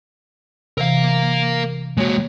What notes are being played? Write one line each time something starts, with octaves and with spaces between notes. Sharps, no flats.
C3 E3 A#4 F5
G#3 A#3 F#4 C#5